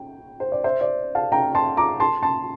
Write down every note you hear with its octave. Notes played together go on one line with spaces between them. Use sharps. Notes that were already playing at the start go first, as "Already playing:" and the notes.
Already playing: G5
C5
D5
C5 E5
D5
F5 A5
G5 A#5
A5 C6
A#5 D6
A5 C6
A5 C6